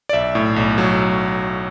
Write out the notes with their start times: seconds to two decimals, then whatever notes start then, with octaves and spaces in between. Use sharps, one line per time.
0.09 D5
0.13 B1 E5
0.35 A2
0.56 B1
0.78 F#3